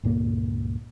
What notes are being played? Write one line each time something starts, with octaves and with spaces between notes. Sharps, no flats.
C#2 G2 A#2 A#3